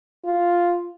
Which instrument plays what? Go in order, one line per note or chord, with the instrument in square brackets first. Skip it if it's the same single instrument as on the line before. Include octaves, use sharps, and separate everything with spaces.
[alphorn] F4